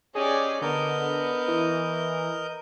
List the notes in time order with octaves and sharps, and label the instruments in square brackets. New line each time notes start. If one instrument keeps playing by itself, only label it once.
[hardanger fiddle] C#4 D5 [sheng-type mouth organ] G4 D#5 [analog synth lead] G#4
[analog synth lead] D3 [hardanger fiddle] B3 [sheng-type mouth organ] A#4 D#5 G6
[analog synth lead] E3